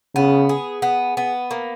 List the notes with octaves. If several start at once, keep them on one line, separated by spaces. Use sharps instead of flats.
C#3 B3
G#4
B3
B3
A#3